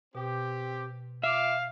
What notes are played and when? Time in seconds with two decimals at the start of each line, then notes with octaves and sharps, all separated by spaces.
0.15 B2 C4 G4
1.23 F4 E5 F5 D6